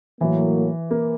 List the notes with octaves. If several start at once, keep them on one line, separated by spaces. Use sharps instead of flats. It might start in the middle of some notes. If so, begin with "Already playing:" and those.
A2 E3 F#3 A#3
A#3